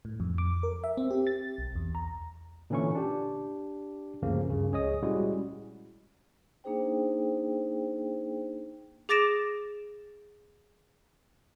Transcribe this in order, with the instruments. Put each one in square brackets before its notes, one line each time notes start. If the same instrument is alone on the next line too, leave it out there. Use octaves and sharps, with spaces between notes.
[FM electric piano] A2
F2
D6
A#4
E5
C4
G4
A6
B1
E2
A#5
[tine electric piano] A#2 D3 E3 C#4 E4 C#6
D4 G4
D2 G2 C#3 F3 A#3
G2 C#3
C#2 G#4 C#5 D#5 D#6
A#2 G3 G#3 C#4 E4 F#4
[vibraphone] A#3 D4 D#4 G#4 C5 G5
[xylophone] G#4 D6 A6 A#6 D7 E7